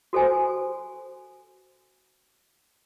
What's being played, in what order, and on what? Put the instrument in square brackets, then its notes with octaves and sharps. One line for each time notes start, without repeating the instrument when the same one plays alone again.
[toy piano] F#4 A4 C5 G#5